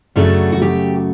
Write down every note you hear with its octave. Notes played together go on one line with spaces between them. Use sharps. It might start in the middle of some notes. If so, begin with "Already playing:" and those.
F#2 C#3 F#3 A3 D4
F#4
G4